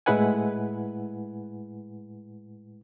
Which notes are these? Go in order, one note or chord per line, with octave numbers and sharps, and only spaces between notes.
A2 G#3 E4 B4 F#5 G#5